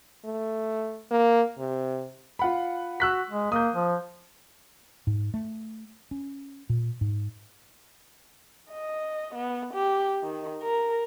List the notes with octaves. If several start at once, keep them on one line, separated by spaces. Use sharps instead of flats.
A3
A#3
C3
F4 F#5 B5
F#4 E6 F#6 B6
G#3
A#3 D#6 G6
F3
G#2
A3
C#4
A#2
G#2
D#5
B3
G4
D#3
A#4